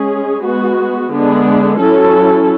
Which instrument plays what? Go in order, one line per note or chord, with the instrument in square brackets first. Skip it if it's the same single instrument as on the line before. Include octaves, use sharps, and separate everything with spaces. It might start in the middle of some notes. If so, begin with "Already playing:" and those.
Already playing: [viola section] G#3 C#4 G#4
G#3 B3 F#4
D3 G#3 B3 D4
F#3 C#4 E4 A4